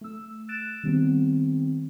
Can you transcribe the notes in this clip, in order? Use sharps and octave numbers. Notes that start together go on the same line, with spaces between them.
A3 E6
F#6 A6 D7 E7
D#3 G3 B3 C4